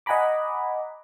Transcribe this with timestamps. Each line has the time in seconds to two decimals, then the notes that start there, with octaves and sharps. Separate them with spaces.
0.06 D#5 F#5 G#5 A#5 B5 D6